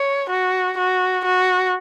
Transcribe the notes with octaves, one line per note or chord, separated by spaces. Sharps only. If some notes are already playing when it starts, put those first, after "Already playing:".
Already playing: C#5
F#4
F#4
F#4